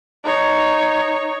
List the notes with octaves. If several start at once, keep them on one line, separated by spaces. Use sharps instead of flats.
D#4 C#5